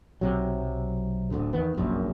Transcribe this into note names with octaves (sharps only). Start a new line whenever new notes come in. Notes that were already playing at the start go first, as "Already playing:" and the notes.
B1 C3 F#3
D1 D2 D3
E2 D#3 B3
F1 A#1 F#2